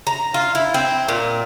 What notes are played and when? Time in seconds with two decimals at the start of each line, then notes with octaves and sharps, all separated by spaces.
0.07 A#5
0.34 F4
0.55 E4
0.74 C4
1.08 A#2